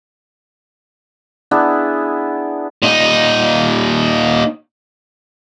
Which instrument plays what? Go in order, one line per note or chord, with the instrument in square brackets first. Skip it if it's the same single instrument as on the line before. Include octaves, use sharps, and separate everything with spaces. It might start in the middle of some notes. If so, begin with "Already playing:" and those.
[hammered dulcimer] B3 D4 E4 G#4
[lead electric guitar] A#2 D#4